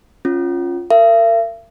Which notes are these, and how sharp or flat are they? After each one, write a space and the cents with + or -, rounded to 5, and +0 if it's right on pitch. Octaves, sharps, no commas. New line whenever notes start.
C#4 -10 F4 +0
A#4 -30 E5 +45